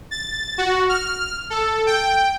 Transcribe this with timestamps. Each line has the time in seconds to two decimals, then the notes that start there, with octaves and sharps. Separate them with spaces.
0.11 A6
0.58 F#4
0.89 F6
1.50 A4
1.87 G5